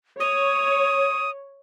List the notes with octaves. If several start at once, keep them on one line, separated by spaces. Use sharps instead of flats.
C#5 D#6